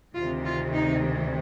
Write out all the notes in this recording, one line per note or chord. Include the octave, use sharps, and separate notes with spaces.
D2 C3 D#3 F4
F4
D#4